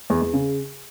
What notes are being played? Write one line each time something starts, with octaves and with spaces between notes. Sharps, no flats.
E2
E2
C#3